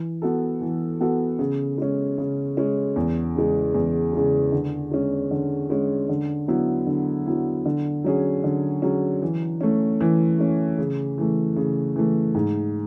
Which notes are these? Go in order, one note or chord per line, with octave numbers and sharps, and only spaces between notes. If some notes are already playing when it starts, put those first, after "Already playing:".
Already playing: E3
B3 F#4 A4
E3
B3 F#4 A4
C#3
G#3 C#4
C#3
G#3 C#4
E2
C#3 G#3
E2
C#3 G#3
D3
G#3 C#4
D3
G#3 C#4
D3
F#3 B3 E4
D3
F#3 B3 E4
D3
F#3 C#4 G#4
D3
F#3 C#4 G#4
E3
A3 C#4
E3
A3 C#4
C#3
E3 A3
C#3
E3 A3
G#2